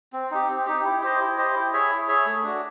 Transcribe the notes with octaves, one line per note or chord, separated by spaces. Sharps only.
C4
D#4 G4
C4
D#4 G4
E4
G4 C5 D#5
E4
G4 C5 D#5
E4
G#4 C#5 E5
E4
G#4 C#5 E5
A3
D4 F#4